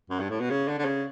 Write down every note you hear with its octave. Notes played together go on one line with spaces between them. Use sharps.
F#2
G2
A2
B2
C#3
D3
D3
C#3